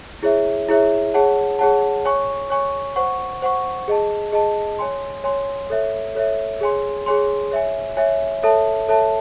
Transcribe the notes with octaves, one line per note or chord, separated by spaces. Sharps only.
E4 G#4 C#5 E5
E4 G#4 C#5 E5
G#4 C#5 F#5 A5
G#4 C#5 F#5 A5
C#5 G#5 C#6
C#5 G#5 C#6
C5 F#5 C#6
C5 F#5 C#6
G#4 D#5 A5
G#4 D#5 A5
C#5 G#5 C6
C#5 G#5 C6
A4 C#5 E5
A4 C#5 E5
G#4 C#5 G#5 C6
G#4 C#5 G#5 C6
C#5 E5 G#5
C#5 E5 G#5
A4 C#5 E5 A5
A4 C#5 E5 A5